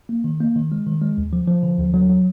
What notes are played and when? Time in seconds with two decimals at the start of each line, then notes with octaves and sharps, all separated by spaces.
0.09 A#3
0.24 D#3
0.41 A#3
0.56 D#3
0.72 G#3
0.87 D#3
1.01 G#3
1.18 D#2
1.33 F3
1.48 F3
1.63 D3
1.79 D#2
1.94 F#3
2.10 F#3